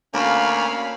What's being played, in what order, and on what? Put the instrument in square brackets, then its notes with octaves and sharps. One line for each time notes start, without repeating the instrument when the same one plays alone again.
[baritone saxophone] D2 [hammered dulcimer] A#3 [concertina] C#4 C#5 [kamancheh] F5 B5